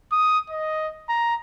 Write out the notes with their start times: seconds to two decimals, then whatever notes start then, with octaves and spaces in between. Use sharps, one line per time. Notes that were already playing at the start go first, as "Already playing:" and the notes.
0.12 D#6
0.50 D#5
1.09 A#5